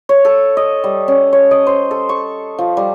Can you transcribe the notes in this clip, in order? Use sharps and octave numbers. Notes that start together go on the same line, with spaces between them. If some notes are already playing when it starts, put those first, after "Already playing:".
C#5
A4
D#5
G3
C#4
C#5
D#5
C5
A4
C#6
F3
G3